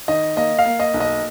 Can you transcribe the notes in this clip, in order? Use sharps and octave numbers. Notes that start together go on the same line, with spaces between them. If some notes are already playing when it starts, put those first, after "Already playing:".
D#3 D#5
A#3 D#5
F5
A#3
D#5
B1
D#5